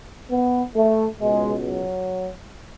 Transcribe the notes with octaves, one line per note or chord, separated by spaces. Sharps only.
B3
A3
C#2 B2 G#3
F#3